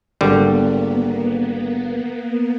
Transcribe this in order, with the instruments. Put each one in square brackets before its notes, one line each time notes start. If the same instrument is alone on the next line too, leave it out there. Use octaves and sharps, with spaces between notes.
[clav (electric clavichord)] G#1 D3 G3 [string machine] A#3 B3